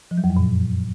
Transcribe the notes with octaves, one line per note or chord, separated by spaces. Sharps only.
F3
F#3
F2
F#2
A#2